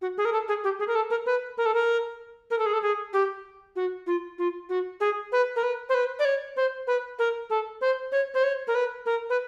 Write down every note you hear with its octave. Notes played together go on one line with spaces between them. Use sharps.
F#4
G#4
A#4
A4
G#4
G4
G#4
A#4
A4
A#4
B4
A#4
A4
A#4
A#4
A4
G#4
A4
G#4
G4
F#4
F4
F4
F#4
G#4
B4
A#4
B4
C5
B4
D5
C#5
C5
B4
A#4
A4
C5
C#5
C5
C#5
A#4
B4
A#4
B4